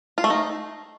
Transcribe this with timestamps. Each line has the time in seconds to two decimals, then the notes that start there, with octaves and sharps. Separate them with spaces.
0.18 F4
0.24 A3
0.30 D#4